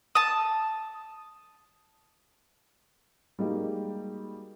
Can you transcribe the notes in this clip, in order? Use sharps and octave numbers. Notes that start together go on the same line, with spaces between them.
A5 D#6
G3 G#3 A#3 D#4 F#4 G4